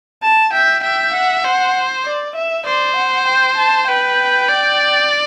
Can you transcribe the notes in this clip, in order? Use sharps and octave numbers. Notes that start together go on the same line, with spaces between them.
A5
E5 G5
E5 G5
F#5
C5 F#5
D5
E5
C5 D5
F#5
G5
A5
B4 G5
D5